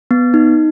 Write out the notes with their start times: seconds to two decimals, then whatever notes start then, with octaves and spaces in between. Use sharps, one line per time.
0.11 B3
0.34 D#4